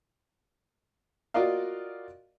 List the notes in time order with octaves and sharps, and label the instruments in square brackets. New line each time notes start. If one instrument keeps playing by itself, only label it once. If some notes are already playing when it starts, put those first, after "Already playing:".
[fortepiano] F4 F#4 A#4 D5 D#5 F5